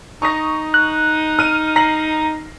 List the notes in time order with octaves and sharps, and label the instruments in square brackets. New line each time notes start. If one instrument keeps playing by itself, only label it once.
[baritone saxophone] D#4 [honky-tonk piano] C#6 D#6 A#6
[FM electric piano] F#6
[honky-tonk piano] F6 D#7
[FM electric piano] A#5 [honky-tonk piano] A#6 C7 F#7